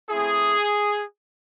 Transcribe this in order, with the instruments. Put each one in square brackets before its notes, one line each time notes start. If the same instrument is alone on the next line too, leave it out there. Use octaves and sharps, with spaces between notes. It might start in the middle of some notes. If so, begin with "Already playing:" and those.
[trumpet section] A3 C4 E4 G#4